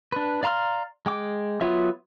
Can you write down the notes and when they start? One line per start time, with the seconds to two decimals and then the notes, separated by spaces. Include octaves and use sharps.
0.12 D4 B4
0.43 D5 F5 A#5 C6 F6
1.06 G#3 G5 D6
1.61 F#3 B3 F4 C#5 E5